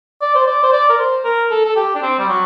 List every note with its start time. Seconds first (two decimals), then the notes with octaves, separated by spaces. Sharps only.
0.21 D5
0.35 C5
0.47 D5
0.63 C5
0.73 D5
0.90 A#4
0.99 C5
1.24 A#4
1.51 A4
1.65 A4
1.76 G4
1.95 D4
2.02 C4
2.19 G3
2.29 F#3